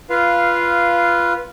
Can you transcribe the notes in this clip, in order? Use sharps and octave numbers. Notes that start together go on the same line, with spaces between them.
F4 B4 F5